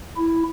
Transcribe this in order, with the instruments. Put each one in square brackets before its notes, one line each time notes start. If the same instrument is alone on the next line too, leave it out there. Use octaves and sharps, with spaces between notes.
[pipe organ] E4